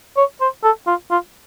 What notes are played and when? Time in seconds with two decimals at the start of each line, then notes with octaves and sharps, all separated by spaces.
0.17 C#5
0.41 C5
0.64 A4
0.87 F4
1.10 F4